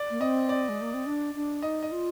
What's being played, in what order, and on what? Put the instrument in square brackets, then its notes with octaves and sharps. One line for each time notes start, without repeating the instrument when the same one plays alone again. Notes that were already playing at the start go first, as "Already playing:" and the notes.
Already playing: [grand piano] D5
[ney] A#3
[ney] C4 [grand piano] D#5
[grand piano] D5
[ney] G#3
A#3
C4
D4
D4
[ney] D#4 [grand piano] D#5
[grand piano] D#5
[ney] F4